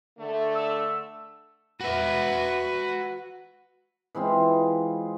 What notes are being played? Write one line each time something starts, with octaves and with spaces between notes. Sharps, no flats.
D3 A3
E6
F#4 B4 E5
E3 G#3 C4 F4